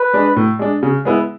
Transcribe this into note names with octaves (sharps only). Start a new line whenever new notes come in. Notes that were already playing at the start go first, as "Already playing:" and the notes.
Already playing: B4
G#3 D4
A2
G#3 D4
C#3
G#3 B3 E4